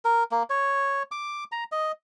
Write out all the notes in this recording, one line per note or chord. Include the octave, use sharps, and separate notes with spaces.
A#4
A#3
C#5
D6
A#5
D#5